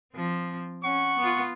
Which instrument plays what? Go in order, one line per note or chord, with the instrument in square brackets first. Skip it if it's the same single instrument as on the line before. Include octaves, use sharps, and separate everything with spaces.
[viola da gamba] F3 C4
[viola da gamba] C#4 [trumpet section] F#5 C#6
[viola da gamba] B3 F4